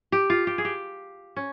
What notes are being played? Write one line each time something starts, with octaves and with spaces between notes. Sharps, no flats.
G4
F4
G4
G#4
G4
C#4